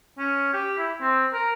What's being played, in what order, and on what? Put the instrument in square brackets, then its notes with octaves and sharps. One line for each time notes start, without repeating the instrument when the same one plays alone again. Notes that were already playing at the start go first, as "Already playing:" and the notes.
[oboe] C#4
G4
E4
C4
A#4